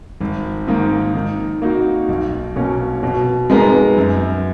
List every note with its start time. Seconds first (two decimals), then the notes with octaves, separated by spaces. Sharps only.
0.21 G#1
0.67 G#2 D#3 A#3
1.14 D#3
1.62 A#3 D#4 F#4
2.08 B1
2.56 B2 A#3 C#4
3.03 B2
3.50 G#3 B3 D#4 A#4
3.97 F#2